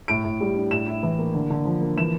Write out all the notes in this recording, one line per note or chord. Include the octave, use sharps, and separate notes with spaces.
A2 D7
A2
G3
D4
A2 E7
E4
E3
A#3
D3
D3
F3
A#3
E3 E7